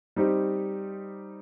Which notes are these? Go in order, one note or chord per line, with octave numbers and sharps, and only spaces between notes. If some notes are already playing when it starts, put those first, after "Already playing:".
G3 C4 D#4 G4